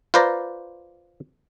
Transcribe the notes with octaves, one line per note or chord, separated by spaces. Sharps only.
F4 B4 C5 D5 A#5